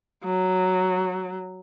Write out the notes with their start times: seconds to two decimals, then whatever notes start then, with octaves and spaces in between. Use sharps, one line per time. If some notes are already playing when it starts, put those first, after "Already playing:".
0.25 F#3